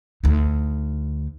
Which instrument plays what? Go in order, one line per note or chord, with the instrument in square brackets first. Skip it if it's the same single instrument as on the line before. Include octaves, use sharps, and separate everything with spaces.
[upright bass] D2 D#4